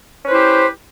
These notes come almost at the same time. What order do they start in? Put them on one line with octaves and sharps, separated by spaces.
C#4 B4 C5 E4 G4